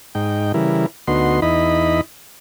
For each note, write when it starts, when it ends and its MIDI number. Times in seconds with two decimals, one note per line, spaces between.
0.15 0.52 44
0.15 0.52 63
0.15 0.52 79
0.54 0.86 49
0.54 0.86 52
0.54 0.86 55
0.54 0.86 64
0.54 0.86 70
1.08 1.40 38
1.08 1.40 59
1.08 1.40 63
1.08 1.40 66
1.08 1.40 84
1.42 2.01 40
1.42 2.01 63
1.42 2.01 64
1.42 2.01 75
1.42 2.01 83